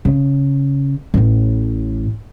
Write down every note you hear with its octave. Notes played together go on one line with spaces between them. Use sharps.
C#3
A1 A2